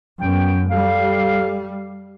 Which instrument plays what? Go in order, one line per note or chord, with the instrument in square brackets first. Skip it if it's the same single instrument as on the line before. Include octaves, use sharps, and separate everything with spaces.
[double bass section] F#2 B3 [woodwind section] C#4 G5
[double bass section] G3 [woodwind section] A4 F5